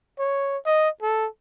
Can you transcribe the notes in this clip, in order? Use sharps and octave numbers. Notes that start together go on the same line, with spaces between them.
C#5
D#5
A4